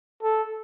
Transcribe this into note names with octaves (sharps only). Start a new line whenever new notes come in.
A4